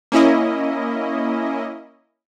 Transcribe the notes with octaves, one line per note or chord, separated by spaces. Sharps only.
A#3 C#4 E4 D#5